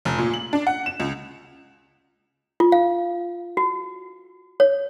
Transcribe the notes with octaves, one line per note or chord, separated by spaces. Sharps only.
F1
A#2
F#7
D4
F#5
E7
C#2
F4
F5
F#4
C#5